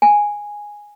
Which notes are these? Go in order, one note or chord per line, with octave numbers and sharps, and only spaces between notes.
G#5